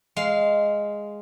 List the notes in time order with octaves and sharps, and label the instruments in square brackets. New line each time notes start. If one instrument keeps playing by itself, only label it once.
[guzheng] G#3 F5